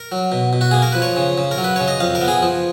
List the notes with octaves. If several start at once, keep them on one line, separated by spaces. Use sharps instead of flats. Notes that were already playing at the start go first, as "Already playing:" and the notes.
Already playing: A#4
F#3
B2
B2
F#4
A#3 G#4
A#4
F3 B4
C#5
C#3
C#3
A#4
F#3
B4
C#3 C#5
D#5
F2 F5
A#4
B3
G#4
F3